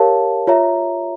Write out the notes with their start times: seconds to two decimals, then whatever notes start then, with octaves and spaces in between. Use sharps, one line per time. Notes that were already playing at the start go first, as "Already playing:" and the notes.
Already playing: G4 A#4 C#5 F5 A5
0.47 F4 C#5 E5 A#5